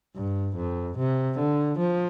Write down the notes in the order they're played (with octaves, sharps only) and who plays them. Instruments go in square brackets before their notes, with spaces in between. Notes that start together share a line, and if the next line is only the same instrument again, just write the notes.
[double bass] G2
F2
C3
D3
F3